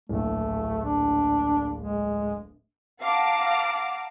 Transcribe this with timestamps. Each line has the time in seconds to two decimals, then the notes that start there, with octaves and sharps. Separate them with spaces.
0.09 D1 A#1 A3
0.84 D4
1.78 G#3
3.01 F5 F#5 A5 A#5 D6